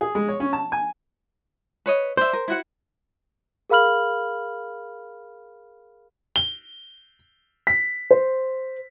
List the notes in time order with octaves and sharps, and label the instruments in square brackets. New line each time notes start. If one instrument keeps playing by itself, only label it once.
[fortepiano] G#4
G#3
C#5
C#4
A5
G#5
[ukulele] B4 C#5 D#5
[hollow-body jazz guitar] C5 [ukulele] D5 E5
[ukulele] A#4
E4 F#4 F#5
[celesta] G#4 A#4 F5 B5 F6 F#7
[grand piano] G7
B6
C5